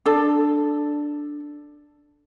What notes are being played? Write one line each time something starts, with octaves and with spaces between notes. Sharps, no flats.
D4 A4